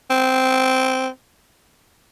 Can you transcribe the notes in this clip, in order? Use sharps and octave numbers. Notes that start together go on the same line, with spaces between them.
C4